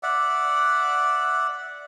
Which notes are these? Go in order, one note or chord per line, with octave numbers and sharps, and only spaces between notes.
D5 E5 F#5